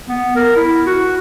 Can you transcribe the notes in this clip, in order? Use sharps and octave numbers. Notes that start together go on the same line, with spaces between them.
B3
A#4
E4
F#4